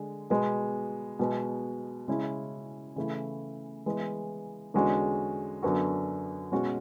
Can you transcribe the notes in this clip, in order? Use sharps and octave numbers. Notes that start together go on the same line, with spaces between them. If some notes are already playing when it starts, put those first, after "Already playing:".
Already playing: D3 G#3
B2 G#3 B3
B2 G#3 B3
C#3 G#3 C#4 E4
C#3 E3 A3 E4
E3 G#3 B3
E2 D3 G#3 C#4 F#4
F#2 D3 F#3 B3 F#4
B2 G#3 C#4 F#4